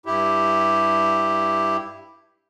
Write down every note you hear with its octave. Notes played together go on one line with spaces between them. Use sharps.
G2 E4 G4